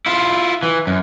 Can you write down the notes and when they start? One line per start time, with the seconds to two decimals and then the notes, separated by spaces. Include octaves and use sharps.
0.06 E4 F4
0.63 E3
0.87 F#2